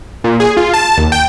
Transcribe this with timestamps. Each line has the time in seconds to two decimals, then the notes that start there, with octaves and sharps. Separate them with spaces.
0.24 A#2
0.40 G#4
0.57 F4
0.74 A5
0.98 D#2
1.12 G5